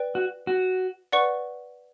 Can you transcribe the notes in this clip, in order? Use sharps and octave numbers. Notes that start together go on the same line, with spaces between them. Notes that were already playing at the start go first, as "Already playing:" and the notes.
Already playing: B4 D5 G5
F#4
F#4
B4 D5 F#5 C#6